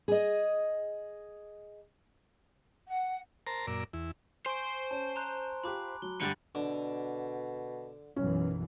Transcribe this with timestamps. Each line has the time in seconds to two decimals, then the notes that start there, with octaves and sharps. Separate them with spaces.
0.08 G#4 D#5
2.88 F#5
3.47 A#4 C5 A5 A#5
3.67 F#2 A#2 A#4 D5 E6
3.93 E2 E4
4.46 C5 G#5 C#6 D7
4.91 C#4 A5
5.16 A#5 C6 F#6
5.64 F4 G4 B5 D6 F#6
6.02 F#3 G7
6.22 G2 D3 G4 B5 F#6 G6 A6
6.55 B2 D3
8.16 B1 F#2 E3 C#4